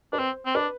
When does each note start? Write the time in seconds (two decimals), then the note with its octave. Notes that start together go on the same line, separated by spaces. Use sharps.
0.12 D4 B4
0.18 C4 C5
0.46 C4
0.55 D4 B4